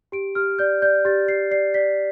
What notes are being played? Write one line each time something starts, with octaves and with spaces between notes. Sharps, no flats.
G4 D7
G4 F6
D5 G6
D5 G6
G4 A6
G4 C7
D5 C7
D5 B6